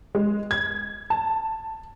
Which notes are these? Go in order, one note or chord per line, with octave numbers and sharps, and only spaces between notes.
G#3
G#6
A5